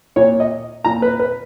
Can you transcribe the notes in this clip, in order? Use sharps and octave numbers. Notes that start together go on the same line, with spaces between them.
A#2 C#5
D#5
A#2 A#5
B4
B4